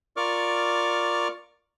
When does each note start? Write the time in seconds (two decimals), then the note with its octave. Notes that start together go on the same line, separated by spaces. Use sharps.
0.17 F4 A#4 D5 C#6 D6 F6